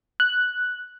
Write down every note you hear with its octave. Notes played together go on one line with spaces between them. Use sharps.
F#6